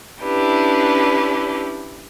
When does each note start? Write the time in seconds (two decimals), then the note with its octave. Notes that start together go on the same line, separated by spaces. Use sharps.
0.21 C#4 D4 E4 G4 B4